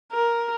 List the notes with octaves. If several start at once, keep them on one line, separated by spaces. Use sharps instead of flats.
A#4